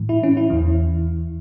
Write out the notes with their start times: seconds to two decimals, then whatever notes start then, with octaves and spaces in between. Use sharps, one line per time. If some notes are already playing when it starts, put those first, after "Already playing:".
Already playing: A2 E3
0.09 E4
0.23 C#4
0.37 E4
0.50 E2 E3